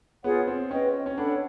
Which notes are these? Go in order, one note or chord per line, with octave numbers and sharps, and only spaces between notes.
B3 F4 G#4 C#5 F#5
C4
C#4 B4 D#5 G5
C#4
D4 A4 C#5 F#5 B5